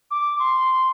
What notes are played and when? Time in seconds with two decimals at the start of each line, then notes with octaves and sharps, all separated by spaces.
0.11 D6
0.39 C6